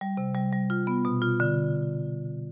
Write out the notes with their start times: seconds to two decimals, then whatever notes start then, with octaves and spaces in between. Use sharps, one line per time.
0.01 G3
0.17 C3
0.35 G3
0.52 G3
0.70 F4
0.87 B3
1.05 B2
1.22 F4
1.40 D3